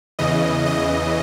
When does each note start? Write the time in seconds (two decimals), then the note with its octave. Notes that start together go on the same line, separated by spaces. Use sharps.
0.19 E2 C#3 E3 D#5
0.66 D#5